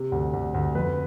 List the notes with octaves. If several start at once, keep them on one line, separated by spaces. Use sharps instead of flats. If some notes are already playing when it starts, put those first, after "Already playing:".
Already playing: C3
D2
D2
D2
F2 B4